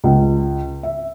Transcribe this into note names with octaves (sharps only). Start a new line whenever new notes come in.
C#2
E5